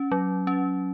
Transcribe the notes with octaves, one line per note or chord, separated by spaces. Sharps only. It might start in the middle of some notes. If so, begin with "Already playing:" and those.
Already playing: C#4
F#3
C#4